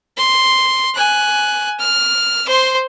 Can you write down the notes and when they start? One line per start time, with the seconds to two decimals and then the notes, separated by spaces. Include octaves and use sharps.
0.17 C6
0.95 G#5 F#6
1.79 F6
2.47 C5 C6